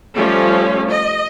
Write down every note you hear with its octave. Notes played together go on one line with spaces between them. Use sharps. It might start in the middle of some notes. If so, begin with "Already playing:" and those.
F3 G3 A3 C#4
D#5